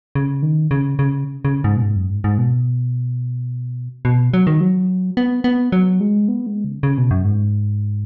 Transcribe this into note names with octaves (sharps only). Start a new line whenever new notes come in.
C#3
D#3
C#3
C#3
C#3
G#2
B2
G#2
F#2
G#2
G#2
B2
B2
F#3
D#3
F#3
B3
B3
F#3
G#3
B3
G#3
C#3
C#3
B2
F#2
G#2